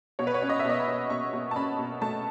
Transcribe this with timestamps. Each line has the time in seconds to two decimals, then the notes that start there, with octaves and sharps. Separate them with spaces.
0.19 B2 C#5
0.27 B4
0.34 C#5
0.42 C#4
0.49 D#5
0.59 E5
0.65 B2 D#5
0.80 B5
0.87 B2
1.10 B2 C#6
1.33 B2
1.51 A5
1.56 C#4 B5
1.79 B2
2.01 A3 A5